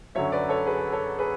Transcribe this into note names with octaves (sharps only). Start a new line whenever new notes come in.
F#2 D3 F#3 C#5 E5
B4 D5
A4 C#5
G#4 B4
A4 C#5
G#4 B4